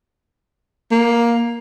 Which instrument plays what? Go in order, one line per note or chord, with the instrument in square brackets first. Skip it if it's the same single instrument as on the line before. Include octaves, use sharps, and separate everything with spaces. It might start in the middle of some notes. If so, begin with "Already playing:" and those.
[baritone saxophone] A#3